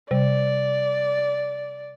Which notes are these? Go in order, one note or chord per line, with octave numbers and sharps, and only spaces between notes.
C3 G3 D5